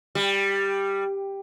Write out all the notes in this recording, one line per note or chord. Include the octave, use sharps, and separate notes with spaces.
G3